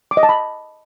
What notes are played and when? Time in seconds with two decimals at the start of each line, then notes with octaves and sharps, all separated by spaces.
0.11 D6
0.17 D#5
0.23 A5
0.29 B5